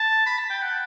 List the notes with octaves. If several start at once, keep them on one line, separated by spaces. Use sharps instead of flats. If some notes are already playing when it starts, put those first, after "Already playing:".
Already playing: A5
B5
A5
G5
F#5